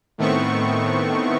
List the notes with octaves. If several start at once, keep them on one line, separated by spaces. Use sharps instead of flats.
A2 D#3 A3 B3 C4 C#6